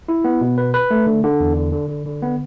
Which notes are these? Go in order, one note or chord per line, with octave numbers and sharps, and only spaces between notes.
E4
B3
B2
B4
B4
A3
D3
D3
E2
D3
D3
D3
D3
B3